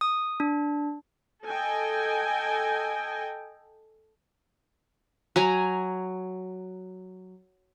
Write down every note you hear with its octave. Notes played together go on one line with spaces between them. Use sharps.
D#6
D4
A4 D#5 G5 G#5
F#3 G#5 A#5